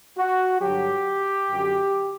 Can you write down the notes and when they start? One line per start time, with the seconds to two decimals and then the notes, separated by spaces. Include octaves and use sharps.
0.18 F#4
0.61 G2 D3 F#3 G4
1.49 F#2 D3 F#3